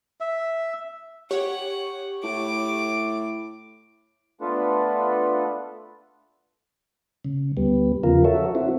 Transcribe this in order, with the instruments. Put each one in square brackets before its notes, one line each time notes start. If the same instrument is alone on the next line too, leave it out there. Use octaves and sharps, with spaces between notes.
[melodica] E5
[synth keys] G4 C#5 C#6 [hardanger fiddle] F#5
[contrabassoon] A2 [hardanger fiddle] D6
[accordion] A3 B3 D4 F4 A4 B4
[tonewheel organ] C#3
D2 G3 B3
E2 C#3 F3 F4 A#4
F#4 A4 C#5 E5
C4 E4 F#4